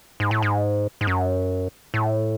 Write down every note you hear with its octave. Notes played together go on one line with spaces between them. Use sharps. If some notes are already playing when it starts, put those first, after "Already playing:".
G#2
A2
G#2
G#2
F#2
A2